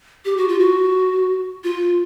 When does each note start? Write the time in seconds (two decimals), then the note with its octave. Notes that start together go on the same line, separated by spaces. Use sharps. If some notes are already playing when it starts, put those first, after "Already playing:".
0.25 G4
0.37 F#4
0.48 F4
0.59 F#4
1.64 F4